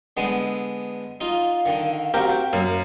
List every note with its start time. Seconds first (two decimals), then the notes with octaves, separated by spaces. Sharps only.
0.17 D3 G#3 B3
1.21 D#4 F4 F5
1.66 D3 D#3
2.14 C4 F#4 G4 A#4
2.53 F#2 A#3